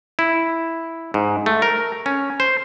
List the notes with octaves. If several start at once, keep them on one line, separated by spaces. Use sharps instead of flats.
E4
G#2
A3
A#4
C#4
C5